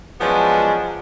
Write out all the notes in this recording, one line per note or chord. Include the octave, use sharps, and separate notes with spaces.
F3 F#3 G#3 B3 C#4 D4